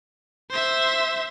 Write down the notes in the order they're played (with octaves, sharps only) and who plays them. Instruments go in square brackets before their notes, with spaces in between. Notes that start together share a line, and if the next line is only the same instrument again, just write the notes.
[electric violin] C5 E5